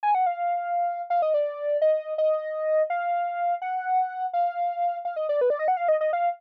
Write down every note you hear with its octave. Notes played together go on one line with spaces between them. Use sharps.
G#5
F#5
F5
F5
D#5
D5
D#5
D#5
F5
F#5
F5
F5
D#5
D5
B4
D5
D#5
F#5
F5
D#5
D#5
F5